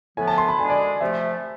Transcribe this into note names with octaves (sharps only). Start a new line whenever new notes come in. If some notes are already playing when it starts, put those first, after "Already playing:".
A2 F3 B3 G#5
A5
C6
B5
D3 G#3 D4 G#4 G#5
D5
C3 F3 A3 E5